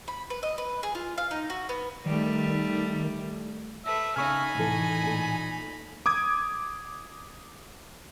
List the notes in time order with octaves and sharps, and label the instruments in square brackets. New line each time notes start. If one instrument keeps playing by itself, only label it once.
[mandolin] B5
B4
D#5
B4
G#4
F4
F5
D#4
F#4
B3
[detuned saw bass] D#3 [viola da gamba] G3 A3
[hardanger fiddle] A3 B4 [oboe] E5
[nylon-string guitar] C#3 C#4 [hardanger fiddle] D#4 B5 [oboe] G#5 [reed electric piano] C#6 F6
[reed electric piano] A2 E3 [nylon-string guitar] C3 A4
[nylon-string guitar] A#2 A3 A4
[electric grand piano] D6 D#6 G#6